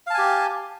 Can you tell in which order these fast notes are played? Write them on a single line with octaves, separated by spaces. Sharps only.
F5 A5 G#5 G4